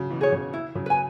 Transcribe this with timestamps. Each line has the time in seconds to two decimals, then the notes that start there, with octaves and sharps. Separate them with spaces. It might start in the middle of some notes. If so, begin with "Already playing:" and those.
Already playing: C#3 F#3
0.10 B2 E3
0.21 G#4 C#5
0.32 C#3
0.54 E4
0.75 C#3 F#3
0.86 B4 G#5